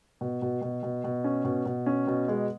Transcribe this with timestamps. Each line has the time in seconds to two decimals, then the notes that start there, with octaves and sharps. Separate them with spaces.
0.21 B2
0.42 B2
0.62 B2
0.83 B2
1.04 B2
1.24 C#4
1.44 B2
1.66 B2
1.86 C#4
2.07 B2
2.28 G#3